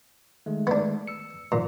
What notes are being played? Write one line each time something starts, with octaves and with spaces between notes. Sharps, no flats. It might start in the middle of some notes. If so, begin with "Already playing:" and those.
D#3 G#3 A3
B3 D4
E6 C#7
A#2 D#3 F3 G3